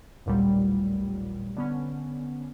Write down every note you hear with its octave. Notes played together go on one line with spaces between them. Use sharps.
A1 D#2 A#2 F#3 G3
D3 B3 C#4